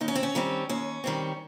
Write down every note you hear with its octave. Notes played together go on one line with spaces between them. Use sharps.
D#2 D#4
C#4
C4
C#4
D#3 G3 C4
D#2 C#4
D#3 G3 C4